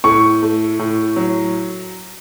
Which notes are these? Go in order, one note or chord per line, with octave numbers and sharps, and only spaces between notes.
A2 C#6
A3
A2
F#3